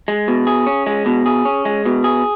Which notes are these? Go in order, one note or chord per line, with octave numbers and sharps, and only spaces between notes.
G#3
B2
G#4
C#4
G#3
B2
G#4
C#4
G#3
B2
G#4